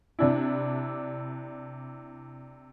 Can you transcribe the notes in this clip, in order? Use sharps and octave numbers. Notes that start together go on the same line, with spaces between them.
C3 D4 E4